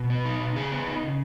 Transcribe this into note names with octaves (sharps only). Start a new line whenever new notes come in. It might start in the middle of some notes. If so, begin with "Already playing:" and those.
Already playing: B2
B3
D#4
B2
C#3 G#4
B3
D#4
C#3